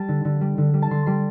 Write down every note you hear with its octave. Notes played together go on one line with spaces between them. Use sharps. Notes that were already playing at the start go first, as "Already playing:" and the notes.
Already playing: G3 A5
D3
D3
G3
D3
G3
A5
D3 C6
G3 C6